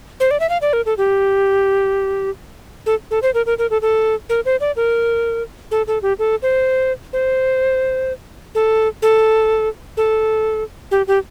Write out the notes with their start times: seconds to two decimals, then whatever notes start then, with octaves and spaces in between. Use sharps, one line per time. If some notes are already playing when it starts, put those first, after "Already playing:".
0.20 C5
0.31 D5
0.40 E5
0.49 F5
0.62 D5
0.73 A#4
0.86 A4
0.97 G4
2.86 A4
3.11 A4
3.22 C5
3.34 A#4
3.46 A#4
3.58 A#4
3.70 A4
3.82 A4
4.29 A#4
4.45 C5
4.61 D5
4.76 A#4
5.71 A4
5.87 A4
6.02 G4
6.19 A4
6.42 C5
7.13 C5
8.55 A4
9.02 A4
9.97 A4
10.91 G4
11.07 G4